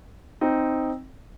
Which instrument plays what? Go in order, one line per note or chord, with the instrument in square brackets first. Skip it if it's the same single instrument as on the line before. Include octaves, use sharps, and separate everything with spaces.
[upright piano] C4 D#4